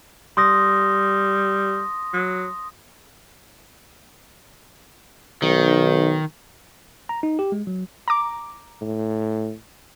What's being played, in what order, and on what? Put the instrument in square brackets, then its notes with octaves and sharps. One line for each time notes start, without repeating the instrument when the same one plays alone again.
[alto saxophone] G3 [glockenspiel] C6 D#6 A#6
[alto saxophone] F#3
[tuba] B1 [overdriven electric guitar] D#3
[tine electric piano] A#5
D#4
G4
G#3
F#3
[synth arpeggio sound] A#5 D6
[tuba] A2